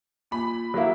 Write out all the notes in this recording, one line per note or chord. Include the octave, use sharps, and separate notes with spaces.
A#2 B5
F#3 A#3 E4